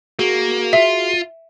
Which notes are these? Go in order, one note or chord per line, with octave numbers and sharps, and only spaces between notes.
A#3 F#4 G#4
F4 E5